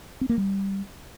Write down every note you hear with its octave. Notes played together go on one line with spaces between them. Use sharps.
C4
A#3
G3